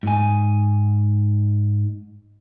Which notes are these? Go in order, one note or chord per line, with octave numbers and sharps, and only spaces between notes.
G#2 G#5